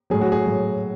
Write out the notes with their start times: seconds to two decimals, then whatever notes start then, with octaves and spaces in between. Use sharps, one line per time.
0.10 A2 F#3 G#4
0.21 F#4
0.32 G#4
0.46 A2 F#3